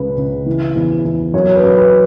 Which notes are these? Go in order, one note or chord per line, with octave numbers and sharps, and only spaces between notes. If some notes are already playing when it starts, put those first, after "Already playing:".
Already playing: C#2 C#3 B4
C#3
E3
E2
E2
F#2 C#5
B4
F#2
B4